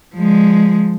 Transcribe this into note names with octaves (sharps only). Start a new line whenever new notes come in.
F3 G#3